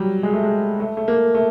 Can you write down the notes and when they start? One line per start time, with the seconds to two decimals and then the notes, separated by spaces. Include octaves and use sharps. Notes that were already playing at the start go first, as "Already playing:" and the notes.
Already playing: F#3 G3
0.23 G#3
0.34 A3
0.43 G#3
0.80 A3
0.97 A3
1.08 A#3
1.35 A3